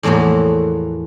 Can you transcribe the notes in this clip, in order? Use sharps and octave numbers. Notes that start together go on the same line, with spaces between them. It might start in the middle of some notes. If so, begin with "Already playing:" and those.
E2 A2 F3 A#3 F#4